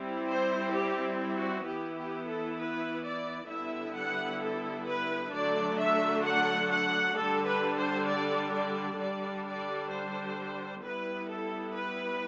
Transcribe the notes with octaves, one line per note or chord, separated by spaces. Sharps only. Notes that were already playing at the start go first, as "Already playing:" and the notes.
Already playing: G3 C4 E4
C5
G4
F#4
E3 B3 E4 G4
G4
A4
B4
D5
D3 G3 B3 E4 E5
F#5
A4
B4
D3 F#3 A3 D4 D5
E5
F#5
F#5
D3 G3 D4 A4
B4
C5
D5
D5
D3 G3 D4 D5
D5
C5
G3 B3 E4 B4
A4
B4